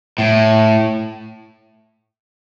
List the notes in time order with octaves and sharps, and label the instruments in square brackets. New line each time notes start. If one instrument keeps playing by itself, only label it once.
[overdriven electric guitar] A2